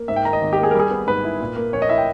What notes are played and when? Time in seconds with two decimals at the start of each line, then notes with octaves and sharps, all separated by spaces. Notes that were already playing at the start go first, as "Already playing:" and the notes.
Already playing: A#3
0.08 G#2 E5
0.16 G5
0.25 D#3 A#5
0.33 D#5
0.41 G#1
0.53 G4
0.58 A#3
0.63 G#4
0.71 A#4
0.75 G3 G#4
0.91 B3
1.07 G#2 B4
1.25 E4
1.40 A#2
1.56 A#3
1.73 A#1 C#5
1.82 D#5
1.89 E4 E5
1.98 G5